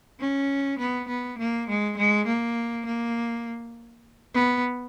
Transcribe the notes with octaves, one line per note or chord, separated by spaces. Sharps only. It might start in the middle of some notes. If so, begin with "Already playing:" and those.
C#4
B3
B3
A#3
G#3
G#3
A#3
A#3
B3